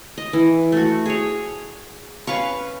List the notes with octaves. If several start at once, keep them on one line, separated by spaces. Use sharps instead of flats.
D#5
E3
A3 F#4
G#4 C#5
C#4 B4 F5 C#6